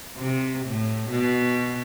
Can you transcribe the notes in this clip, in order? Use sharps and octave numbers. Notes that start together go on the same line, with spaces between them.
C3
A2
B2